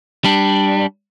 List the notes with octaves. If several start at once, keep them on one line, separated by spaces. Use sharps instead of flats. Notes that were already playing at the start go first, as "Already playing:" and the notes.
G3 D4